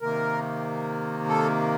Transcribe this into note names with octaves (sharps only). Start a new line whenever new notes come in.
C3 D#3 A#3 A#4
A4